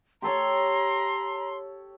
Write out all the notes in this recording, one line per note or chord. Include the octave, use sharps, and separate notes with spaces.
G4 A4 C#5 A#5 C6